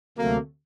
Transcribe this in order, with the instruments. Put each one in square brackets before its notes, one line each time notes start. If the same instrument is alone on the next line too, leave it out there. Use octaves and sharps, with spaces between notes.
[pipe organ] D2 C3 F#3 A3 [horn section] A#3